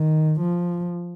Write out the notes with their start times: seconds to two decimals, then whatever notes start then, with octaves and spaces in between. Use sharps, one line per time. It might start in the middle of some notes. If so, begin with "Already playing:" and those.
Already playing: D#3
0.40 F3